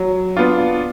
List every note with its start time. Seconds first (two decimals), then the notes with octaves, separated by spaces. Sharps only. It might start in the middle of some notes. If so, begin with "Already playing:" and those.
Already playing: F#3
0.37 B3 D4 F4